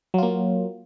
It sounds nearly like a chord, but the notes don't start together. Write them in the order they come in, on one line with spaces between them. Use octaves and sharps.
F#3 F4 A#3